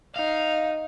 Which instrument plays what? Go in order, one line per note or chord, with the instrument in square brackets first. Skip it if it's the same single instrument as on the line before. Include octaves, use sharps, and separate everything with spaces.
[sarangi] D#4 [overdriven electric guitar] F5